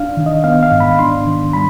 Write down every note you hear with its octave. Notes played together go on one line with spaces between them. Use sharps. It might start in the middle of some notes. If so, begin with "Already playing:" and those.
Already playing: D4 F5
D#3
D#5
B3 F5
F5
G#2
B5
D4 C6
D#3
G3 B5